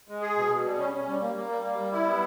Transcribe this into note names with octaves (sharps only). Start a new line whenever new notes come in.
G#3
G#4
B2
B2
G3
C#4
C#4
G3
A#3
A#3
G3
A#3
G3
E4
B3